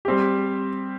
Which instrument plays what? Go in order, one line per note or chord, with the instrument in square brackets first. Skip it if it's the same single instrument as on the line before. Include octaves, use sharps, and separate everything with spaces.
[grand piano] G3 C4 G4